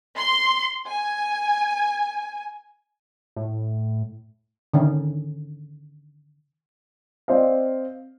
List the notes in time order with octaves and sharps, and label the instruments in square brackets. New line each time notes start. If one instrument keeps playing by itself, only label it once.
[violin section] C6
G#5
[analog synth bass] A2
[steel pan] D3 D#3 C#4
[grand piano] C4 C5 D5 D#5 F5